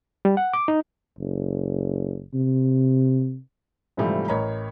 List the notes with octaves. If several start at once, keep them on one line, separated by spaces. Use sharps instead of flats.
G3
F#5
D6
D#4
F#1
C3
G#2 C3 E3 F3 G3 A3
A1 A#4 C#5 D#5 A#5 B5